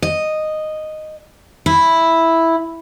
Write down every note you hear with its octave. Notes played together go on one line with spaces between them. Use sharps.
D#5
E4